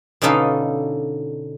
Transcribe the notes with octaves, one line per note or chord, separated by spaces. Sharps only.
B2 D3 C#4 D#4 A4 F5